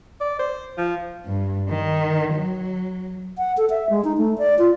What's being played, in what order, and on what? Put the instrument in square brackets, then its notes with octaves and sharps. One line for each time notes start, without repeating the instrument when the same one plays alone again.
[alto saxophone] D5
C5
F3
[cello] G2
D#3
F#3
[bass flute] F#5
A4
E5
G#3
D#4
A3
D5
F4